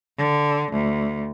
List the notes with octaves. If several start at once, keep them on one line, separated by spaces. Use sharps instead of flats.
D3
D2